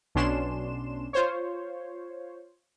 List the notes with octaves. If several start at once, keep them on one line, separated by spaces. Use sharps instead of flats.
B1 B2 C#4 D4 C6 E7
F4 C5 C#5